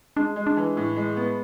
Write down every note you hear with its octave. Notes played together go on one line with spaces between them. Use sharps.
G#3 D4
G#3
D4
E3
A2
G#3
B3